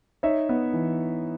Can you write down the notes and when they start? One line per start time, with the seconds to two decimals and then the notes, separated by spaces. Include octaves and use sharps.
0.23 D#4 C#5 E5
0.49 B3
0.73 E3